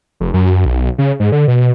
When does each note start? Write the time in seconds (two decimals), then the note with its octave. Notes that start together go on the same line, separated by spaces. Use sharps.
0.20 F1
0.34 F#2
0.66 B1
0.98 C#3
1.20 G#2
1.32 D3
1.48 B2